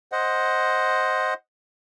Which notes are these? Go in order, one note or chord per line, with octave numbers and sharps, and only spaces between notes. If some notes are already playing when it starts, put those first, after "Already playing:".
C5 D#5 F#5